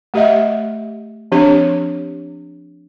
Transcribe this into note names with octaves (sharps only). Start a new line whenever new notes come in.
A3 G4 D#5 E5
F3 C4 D4 G4 C#5